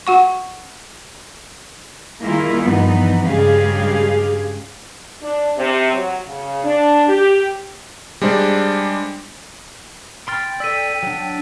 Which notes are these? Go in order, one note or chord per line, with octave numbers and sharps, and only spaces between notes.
F#4 F#5 C#6
D#3 G3 A#3 E4 F4 G#4
G2 E3 F3 B3 D#4
G2 C#3 G#3 G4 G#4 F5
D4
C3
F#3
C#3
D4
G4
G3 G#3 D4 C5 D5
G5 B5 C6 F6 A6 D7
A4 D5 E6 B6 D#7
F#3 D4